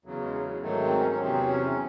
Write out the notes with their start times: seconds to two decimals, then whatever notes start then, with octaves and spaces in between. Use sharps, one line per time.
0.05 E2 C#3 F#3
0.22 G#3
0.34 F#3
0.62 G#2 D#3 F#3 A3
0.81 C4
1.00 C#4
1.10 C#4
1.19 E2 C3 F#3 C4
1.48 C#4